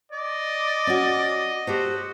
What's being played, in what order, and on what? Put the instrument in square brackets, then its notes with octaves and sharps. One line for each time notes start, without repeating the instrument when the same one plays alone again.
[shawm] D5 [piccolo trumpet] D#5
[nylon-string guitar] C#4 F#4
[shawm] F#4 [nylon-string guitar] G4 A4 C5